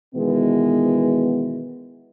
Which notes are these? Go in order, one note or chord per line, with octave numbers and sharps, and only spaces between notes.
B2 D#3 E3 G#3 B3